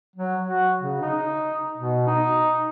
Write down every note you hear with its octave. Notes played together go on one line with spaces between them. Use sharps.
F#3
F#4
C#3
D#4
B2
D#4